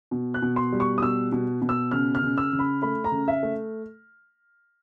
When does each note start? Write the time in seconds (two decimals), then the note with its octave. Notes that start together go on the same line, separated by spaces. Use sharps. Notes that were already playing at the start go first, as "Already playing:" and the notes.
0.11 B2
0.34 F#6
0.42 B2
0.56 C6
0.73 G3
0.80 C#6
0.98 D#6
1.02 B2 E6
1.32 B2
1.62 B2
1.69 E6
1.91 C#3 F6
2.15 F6
2.22 C#3
2.38 E6
2.53 C#3
2.59 B5
2.82 A3 B5
3.04 A#5
3.12 C#3
3.28 E5
3.43 A3